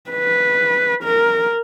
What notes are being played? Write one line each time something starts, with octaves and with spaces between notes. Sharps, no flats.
B4
A#4